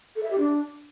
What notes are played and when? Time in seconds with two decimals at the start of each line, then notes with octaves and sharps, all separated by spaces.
0.16 A4
0.23 E5
0.31 G4
0.38 D4